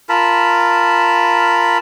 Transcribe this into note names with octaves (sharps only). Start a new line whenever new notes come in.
F4 A#4 A5 B5